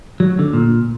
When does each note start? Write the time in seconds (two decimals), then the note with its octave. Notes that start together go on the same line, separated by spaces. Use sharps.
0.20 F#3
0.39 D3
0.53 A#2